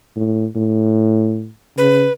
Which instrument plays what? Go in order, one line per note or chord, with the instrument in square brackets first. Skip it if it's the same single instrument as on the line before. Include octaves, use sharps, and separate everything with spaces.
[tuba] A2
A2
[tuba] C#3 [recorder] B4